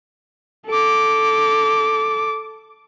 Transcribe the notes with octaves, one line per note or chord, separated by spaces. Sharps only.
A4 D6